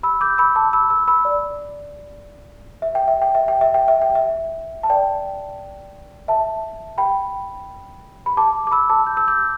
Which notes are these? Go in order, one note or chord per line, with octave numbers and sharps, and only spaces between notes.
B5 E6
D6 G6
B5 E6
A5 D6
B5 E6
B5 E6
B5 E6
D5
E5
G5
E5
G5
E5
G5
E5
G5
E5
G5
E5
A5
D5 G5
E5 A5
G5 B5
B5
A5 D6
D6
B5 E6
A5 D6
G6
E6
D6 G6